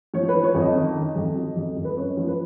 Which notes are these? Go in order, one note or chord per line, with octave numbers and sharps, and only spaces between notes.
F3 C#5
B4
F3
C#5
F2
D#5
D#3
D#3
F2
F#3
F2
F2
B4
F#2 C#5
F3
B4